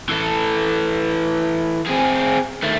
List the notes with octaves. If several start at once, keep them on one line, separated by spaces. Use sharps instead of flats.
E3 A4
C4 G#4
D#3 A3